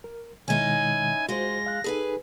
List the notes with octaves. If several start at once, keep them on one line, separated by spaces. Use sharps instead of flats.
A#4
B2 D#3 G#3 C#4 D#4 E4 G#5
G#3 F4 F#4 C5 A#6
F5 F#6
D#4 G#4 A4 B4 G#5